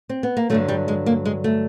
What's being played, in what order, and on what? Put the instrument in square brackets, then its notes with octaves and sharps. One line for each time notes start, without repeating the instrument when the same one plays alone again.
[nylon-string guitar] C4
B3
A#3
G2 D3 F#3 A3
G3
G#3
A#3
G#3
A3